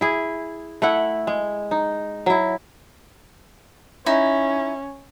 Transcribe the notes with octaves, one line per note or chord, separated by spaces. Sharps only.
E4 G#4
A3 E4 F#5
G#3
D#4
F#3 E4
C#4 D#4 E4